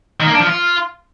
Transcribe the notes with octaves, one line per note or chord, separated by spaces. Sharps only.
D#3
A#3
D4
F3
F4